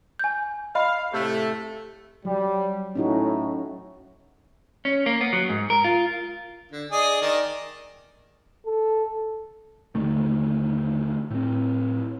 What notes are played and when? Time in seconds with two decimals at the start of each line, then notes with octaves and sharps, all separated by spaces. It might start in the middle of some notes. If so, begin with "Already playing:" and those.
0.19 G#5 G6
0.75 D#5 F5 B5
1.12 A2 C3 A3
2.25 F#3 G3
2.95 A2 C#4 D#4 F#4
4.85 C#4
5.06 A#3
5.21 B3
5.33 F#3
5.49 G#2
5.70 A#4
5.84 F4
6.72 D3
6.91 G#4 D5 D#5
7.21 D#3 D5
8.66 A4
9.95 D#2 D3 D#3 A3
11.30 A2 C4